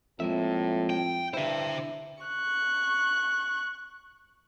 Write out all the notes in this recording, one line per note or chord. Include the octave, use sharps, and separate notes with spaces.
F2 A2 G#3 A#3 E5
G5
G2 D3 E4 C5 E5
C#6 F#6